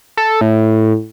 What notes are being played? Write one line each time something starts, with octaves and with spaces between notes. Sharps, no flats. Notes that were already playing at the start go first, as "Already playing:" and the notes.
A4
A2